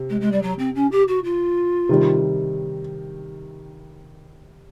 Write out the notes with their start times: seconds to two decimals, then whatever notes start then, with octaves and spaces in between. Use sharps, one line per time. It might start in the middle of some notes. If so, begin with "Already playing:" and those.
Already playing: C3
0.09 G#3
0.20 G#3
0.32 G3
0.42 F#3
0.58 C4
0.75 C#4
0.91 G4
1.08 F#4
1.24 F4
1.89 C3 D#3 G3